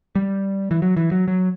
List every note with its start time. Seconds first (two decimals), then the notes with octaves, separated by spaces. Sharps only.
0.16 G3
0.71 E3
0.82 F#3
0.97 E3
1.12 F#3
1.28 F#3